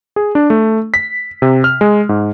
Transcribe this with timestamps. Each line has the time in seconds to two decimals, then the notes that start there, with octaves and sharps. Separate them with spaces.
0.16 G#4
0.35 D4
0.50 A3
0.94 B6
1.42 C3
1.64 F6
1.81 G#3
2.09 G#2